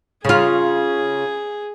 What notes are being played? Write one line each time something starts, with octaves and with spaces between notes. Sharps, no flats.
C#3 F4 G#4